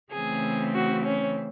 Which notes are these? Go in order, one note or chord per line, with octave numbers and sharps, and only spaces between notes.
C#3 E3 A3 C4 G#4
F#4
C#4